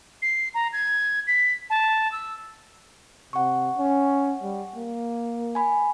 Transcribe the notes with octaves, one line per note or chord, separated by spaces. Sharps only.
C7
A#5
G#6
B6
A5
E6
C3 F#5 C#6
C#4
G3
A#3
G#5 B5